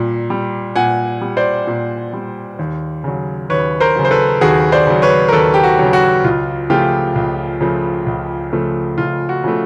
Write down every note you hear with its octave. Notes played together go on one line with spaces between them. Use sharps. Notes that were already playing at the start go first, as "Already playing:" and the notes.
Already playing: A#2 G3
G3
A#2 F#5 G#5
G3
C5 D5
A#2
G3
D#2
C#3 F#3
D#2 B4 C#5
A#4 C5
C#3 F#3
C5
A4 B4
D#2 F#4 G#4
C5 D5
C#3 F#3
B4 C#5
A#4
D#2 A4 B4
G4
F#4
C#3 F#3
F#4
C#2 F4
C#3 F3 A3 F4 G4
C#2
C#3 F3 A3
C#2
C#3 F3 A3
C#2 F4
F#4
C#3 F3 A3